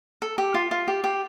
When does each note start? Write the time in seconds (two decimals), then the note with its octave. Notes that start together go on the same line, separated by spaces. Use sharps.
0.22 A4
0.38 G4
0.54 F4
0.71 F4
0.88 G4
1.04 G4